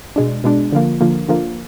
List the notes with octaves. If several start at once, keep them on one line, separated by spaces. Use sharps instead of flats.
B2 G#3 D4
B2 G#3 D4
D3 F3 A#3
D3 F3 A#3
D3 F3 A#3